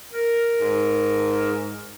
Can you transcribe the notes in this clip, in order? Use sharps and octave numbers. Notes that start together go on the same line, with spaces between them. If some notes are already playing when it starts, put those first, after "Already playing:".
A#4
G#2